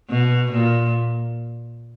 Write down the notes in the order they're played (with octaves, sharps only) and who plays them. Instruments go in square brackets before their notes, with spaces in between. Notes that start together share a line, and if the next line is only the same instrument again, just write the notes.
[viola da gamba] B2
A#2